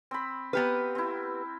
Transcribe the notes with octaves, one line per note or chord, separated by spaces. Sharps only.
C4 B5
B3 G4 B4 F5 A#5
C4 E4